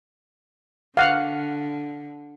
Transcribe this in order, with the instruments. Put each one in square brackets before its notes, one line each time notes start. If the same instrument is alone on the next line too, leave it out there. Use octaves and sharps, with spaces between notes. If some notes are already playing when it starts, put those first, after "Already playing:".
[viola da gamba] D3 [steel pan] F5 F#5